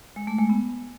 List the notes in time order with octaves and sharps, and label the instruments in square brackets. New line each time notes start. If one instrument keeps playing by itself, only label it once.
[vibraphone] G#3
A3
G#3
B3